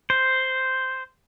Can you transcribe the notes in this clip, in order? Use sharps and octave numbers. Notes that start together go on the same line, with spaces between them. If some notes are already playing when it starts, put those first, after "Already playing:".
C5